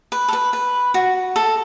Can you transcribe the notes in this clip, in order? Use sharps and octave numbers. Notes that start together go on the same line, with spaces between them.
B4
A4
B4
B4
F#4
A4